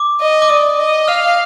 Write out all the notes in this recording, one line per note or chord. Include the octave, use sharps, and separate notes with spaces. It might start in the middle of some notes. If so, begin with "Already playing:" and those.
Already playing: D6
D#5
D6
D5 D#6
D#5
F5 F6